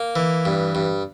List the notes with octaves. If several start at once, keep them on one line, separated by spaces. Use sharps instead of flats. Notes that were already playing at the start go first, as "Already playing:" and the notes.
Already playing: A#3
E3
G2
G2